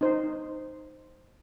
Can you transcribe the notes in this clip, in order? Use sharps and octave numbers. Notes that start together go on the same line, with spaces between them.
D#4 C5